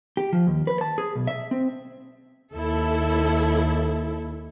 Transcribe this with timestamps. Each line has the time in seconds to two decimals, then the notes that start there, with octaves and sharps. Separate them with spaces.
0.17 G4
0.33 F3
0.47 D#2
0.67 B4
0.81 A5
0.98 G#4
1.15 B1
1.27 E5
1.51 C4
2.55 D#2 E4 A4